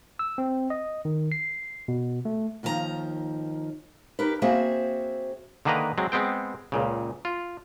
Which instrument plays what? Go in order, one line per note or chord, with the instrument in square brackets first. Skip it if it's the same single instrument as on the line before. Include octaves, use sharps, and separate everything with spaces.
[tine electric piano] E6
C4
D#5
D#3
C7
B2
A3
[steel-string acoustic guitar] D#2 D#3 F3 G4 A#5
D#4 G4 A#4 B4
A#3 C4 F#4 G#4 C5 E5
[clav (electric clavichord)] D3 D#3 A#3 B4 D#5 A#5
F#3 G#3 C4
G#3 B3 C4 G5
C#2 A#2 C#3
F4